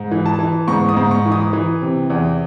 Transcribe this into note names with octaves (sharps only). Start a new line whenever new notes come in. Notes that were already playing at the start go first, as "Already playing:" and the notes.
Already playing: G#2
E3
A5
E3
G#2 C#6
D#6
G#2
C#6
E3
D#6
E3
C3
E2